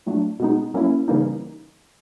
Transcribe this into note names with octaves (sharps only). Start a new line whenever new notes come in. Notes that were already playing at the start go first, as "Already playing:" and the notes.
A2 F#3 A3 D4
B2 G#3 B3 D#4
F#3 A#3 C#4 E4
C#3 E3 G3 A#3 D#4